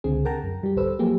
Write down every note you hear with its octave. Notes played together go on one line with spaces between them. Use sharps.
C#2 D3 C4 G#4
A#4 F#5 G5 A5 A#5
F#2
G3 G4
A1 D2 A4 B4 C5 E6
F3 F#3 A#3 G4 G#4